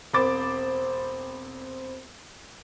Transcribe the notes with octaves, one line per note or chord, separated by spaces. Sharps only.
E1 C4 C5 B5 D6 A6